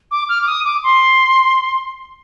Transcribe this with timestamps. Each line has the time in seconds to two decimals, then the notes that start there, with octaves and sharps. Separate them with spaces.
0.11 D6
0.29 F6
0.41 D6
0.47 D#6
0.64 D6
0.83 C6